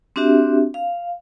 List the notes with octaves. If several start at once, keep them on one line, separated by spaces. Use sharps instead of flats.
C4 D4 F#4 G4 E5
F5